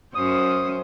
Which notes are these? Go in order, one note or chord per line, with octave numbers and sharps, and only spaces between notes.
F#2 C#4 C5 D#6